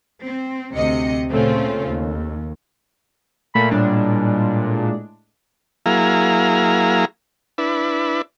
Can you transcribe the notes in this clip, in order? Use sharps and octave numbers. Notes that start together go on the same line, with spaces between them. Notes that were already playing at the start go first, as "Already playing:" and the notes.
C4
D2 C3 D#5 C#7
A#2 C#3 A3 C4 C#4 F4
D#2
A#2 A3 A#3 B5
A2 G3 G#3 D4
F#3 A#3 E4 G#4 F5 A#5
D4 E4 B4